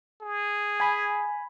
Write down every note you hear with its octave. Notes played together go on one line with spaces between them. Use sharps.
G#4
G#5 B5